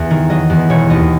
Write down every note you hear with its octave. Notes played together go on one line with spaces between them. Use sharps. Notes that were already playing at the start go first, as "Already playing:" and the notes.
Already playing: E2 E5
D#3
F#3 D#5
E2
E1 C#5
D#2 D#5